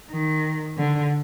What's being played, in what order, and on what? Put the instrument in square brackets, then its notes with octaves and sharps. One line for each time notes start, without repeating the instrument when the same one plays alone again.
[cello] D#3
D3